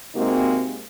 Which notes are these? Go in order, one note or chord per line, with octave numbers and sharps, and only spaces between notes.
C3 G#3 A#3 C4 D#4 F#4